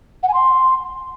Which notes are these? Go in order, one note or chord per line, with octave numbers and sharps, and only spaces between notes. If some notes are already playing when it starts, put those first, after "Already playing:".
F#5
G#5
C6